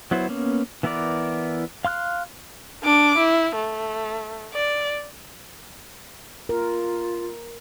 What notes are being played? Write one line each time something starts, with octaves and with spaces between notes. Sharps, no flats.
F#3 B3 E4 C5
A#3 B3 C#4
E3 B3 E4 A#4 D5
F5 C6 F6 F#6
D4 D6
E4
A3
D5
F4 A#4